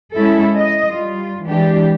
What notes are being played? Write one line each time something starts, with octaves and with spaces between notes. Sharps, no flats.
G#3 C#4 E4 A4
D#5
G3 F4
E3 G#3 D4 G4